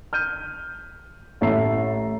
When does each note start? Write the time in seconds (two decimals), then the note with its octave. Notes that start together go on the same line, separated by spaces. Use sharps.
0.13 F6 G6 D#7
1.41 A1 A3 E4 E5 A#5 C7